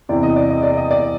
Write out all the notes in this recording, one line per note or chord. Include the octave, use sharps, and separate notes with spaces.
E2 C3 E3 D5
D#5
D5
D#5
D5
D#5
D5